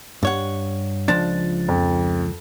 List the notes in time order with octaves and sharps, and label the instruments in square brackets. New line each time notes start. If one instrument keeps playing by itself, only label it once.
[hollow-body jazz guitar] G2 C#5 F#5
[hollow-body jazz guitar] C#2 F3 D4 [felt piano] A6
[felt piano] F2